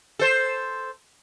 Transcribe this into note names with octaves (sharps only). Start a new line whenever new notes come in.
A4 C5